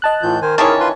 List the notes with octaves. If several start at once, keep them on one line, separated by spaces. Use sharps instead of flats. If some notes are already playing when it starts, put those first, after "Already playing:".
D#5 A5 F#6
A2 E3 F4 G6
D#3 A#4 C5 G#5
D#3 E3 C#4 E4 G#4 A5
F4 B4 C6